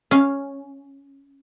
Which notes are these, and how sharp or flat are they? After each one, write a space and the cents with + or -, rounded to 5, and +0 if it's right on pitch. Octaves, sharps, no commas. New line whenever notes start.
C#4 +0 F5 +0